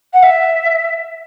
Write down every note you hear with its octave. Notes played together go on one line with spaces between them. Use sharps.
F#5
E5